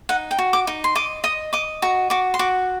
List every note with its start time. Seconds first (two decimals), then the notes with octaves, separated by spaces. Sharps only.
0.09 D#4 F#5
0.31 G5
0.38 F#4
0.53 D6
0.67 D#4
0.84 C6
0.95 D#5 D6
1.24 D#5 D#6
1.53 D#5 D6
1.82 F#4 A#5
2.10 F#4 D6
2.34 C6
2.39 F#4 D6